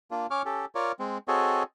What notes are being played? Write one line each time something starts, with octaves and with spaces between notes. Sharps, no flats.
A#3 D4 F4
C#4 C#5 C#6 D6 F6
C#4 G4 A4
F4 A#4 C#5 D5
G#3 C4
C4 F#4 G#4 A4 C#5 D#5